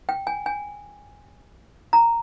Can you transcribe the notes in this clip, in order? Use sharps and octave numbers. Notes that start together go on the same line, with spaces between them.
G5
G#5
G#5
A#5